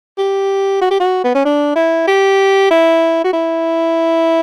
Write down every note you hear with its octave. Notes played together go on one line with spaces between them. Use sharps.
G4
F#4
G4
F#4
B3
C#4
D4
E4
G4
E4
F#4
E4